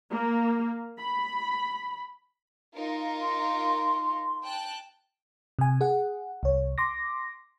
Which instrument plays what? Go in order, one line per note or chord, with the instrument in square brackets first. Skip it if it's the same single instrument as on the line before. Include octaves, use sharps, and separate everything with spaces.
[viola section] A#3
B5
[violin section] D#4 F4 A#4
[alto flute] C6
[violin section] G5 A5 F#6
[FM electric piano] C3 G#5
G#4 F#5
C2 C#5
C6 D6 A#6